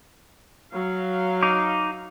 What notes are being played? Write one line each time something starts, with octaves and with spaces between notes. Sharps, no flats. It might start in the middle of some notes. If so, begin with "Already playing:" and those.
F#3 F5
D#4 D6